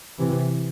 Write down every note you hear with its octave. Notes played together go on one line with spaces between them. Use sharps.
C3 E3